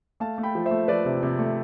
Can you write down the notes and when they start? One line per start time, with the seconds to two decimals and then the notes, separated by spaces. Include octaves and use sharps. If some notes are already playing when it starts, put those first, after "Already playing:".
0.20 A3 F5 A5
0.38 A3
0.43 G5 B5
0.55 F3
0.66 C5 E5
0.71 A3
0.88 F3 B4 D5
1.05 C3
1.23 C3
1.39 A3